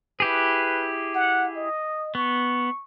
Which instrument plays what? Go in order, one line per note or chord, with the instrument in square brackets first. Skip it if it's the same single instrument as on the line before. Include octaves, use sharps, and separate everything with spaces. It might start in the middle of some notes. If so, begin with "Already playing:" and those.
[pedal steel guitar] E4 G4 G#4 [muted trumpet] B4
[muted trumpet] F#5
D#5
[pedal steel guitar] B3 [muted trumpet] C#6